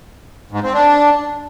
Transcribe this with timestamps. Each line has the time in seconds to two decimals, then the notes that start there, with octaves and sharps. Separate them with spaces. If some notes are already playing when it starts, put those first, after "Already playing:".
0.52 G#2
0.62 C4
0.73 D4